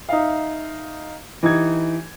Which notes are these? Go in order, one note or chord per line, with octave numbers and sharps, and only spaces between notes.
D#4 E5 F5
E3 D#4 G4 G#6